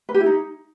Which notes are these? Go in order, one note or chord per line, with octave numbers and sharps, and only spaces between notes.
B4
G4
E4
D#4